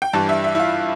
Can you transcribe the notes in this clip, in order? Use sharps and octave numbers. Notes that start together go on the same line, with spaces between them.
G5
G2 E3 G3 A5
E5
E5
E4
F4